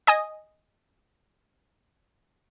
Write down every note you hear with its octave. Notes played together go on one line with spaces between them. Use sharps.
D#5 G#5 D#6